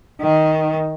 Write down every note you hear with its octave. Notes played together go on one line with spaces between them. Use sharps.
D#3